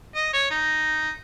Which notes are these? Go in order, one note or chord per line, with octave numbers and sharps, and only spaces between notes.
D#5
C#5
D#4